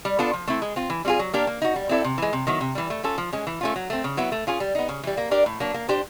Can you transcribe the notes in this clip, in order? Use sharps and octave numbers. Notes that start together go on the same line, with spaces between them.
G3
B3 D4 F4 A4
F3
A3 C4 E4
G#3
C4 F4
E3
G3 C4 F4 G#4
F#3
A#3 D4 G4 A#4
A#3
D#4 F#4
G3
C4 E4 A4 D5
C3
E3 G#3
C3
D#3 F#3 B3 E4
C3
E3 G3
A3
C#4 F4 A4
F3
G#3 C#4
E3
A3 C#4 F4
F#3
A3 C4
C#3
F#3 B3 E4
A3
C#4 F4 G#4
G3
B3 D#4
C#3
E3 G3
A#3
D4 G4 A#4 D5
A2
F#3 A#3 D4
A#3
D4 G4 C5